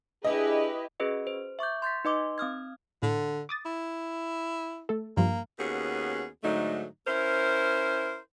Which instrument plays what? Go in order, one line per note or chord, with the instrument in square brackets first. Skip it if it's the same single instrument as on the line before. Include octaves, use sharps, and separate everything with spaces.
[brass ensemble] D4 G#4 [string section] E4 G4 B4 [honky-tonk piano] D#5
[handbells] C#4 F#4 G#4 B4 D#5
C5
E5 C#6 D6 G6
C6 G6 A6 B6
D#4 B4 D#5 C6 D6
C4 D#6 F6 G#6
[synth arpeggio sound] A2 [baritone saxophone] D3
[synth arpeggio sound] D6 D#6 A6
[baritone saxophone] E4
[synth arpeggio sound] A3 A4
[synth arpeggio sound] G2 F3 G3 [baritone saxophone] A#3
[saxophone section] D#2 B3 C#4 F#4 G#4
G#2 D3 F#3 A3 D#4
C#4 E4 A#4 C5